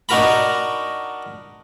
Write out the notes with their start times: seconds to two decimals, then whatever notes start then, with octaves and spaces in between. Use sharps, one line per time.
0.09 D4 D#4 F#4 A#4 A#5 B5